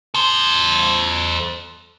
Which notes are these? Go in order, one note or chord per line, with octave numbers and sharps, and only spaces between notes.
A4 C5